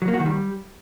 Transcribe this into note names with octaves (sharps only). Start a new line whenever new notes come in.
F#3
A#3
F#4
D#3
G3